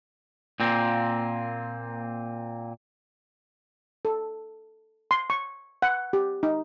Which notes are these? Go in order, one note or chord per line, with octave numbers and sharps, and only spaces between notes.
A#2 A#3 C4
A4
C6
C#6
F#5
G4
D#4